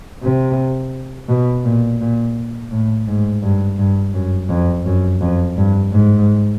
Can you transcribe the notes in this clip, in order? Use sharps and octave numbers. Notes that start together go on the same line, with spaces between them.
C3
B2
A#2
A#2
A2
G#2
G2
G2
F#2
F2
F#2
F2
G2
G#2